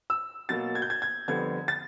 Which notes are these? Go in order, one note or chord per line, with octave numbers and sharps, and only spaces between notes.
E6
B2 F#3 A#3 A6
G#6
G6
G#6
G#6
F2 D3 G3 B3 G#6
A6